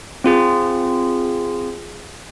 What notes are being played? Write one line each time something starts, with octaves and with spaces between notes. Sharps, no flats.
C4 F4 G#4